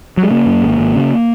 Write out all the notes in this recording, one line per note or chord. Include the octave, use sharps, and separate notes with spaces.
F#3
G#3
C#3 A#3
F#2
G#1
G#1
C#3